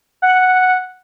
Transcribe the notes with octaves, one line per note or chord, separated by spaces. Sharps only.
F#5